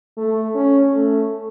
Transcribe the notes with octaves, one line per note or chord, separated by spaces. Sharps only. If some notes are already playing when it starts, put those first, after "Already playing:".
A3
C#4
A3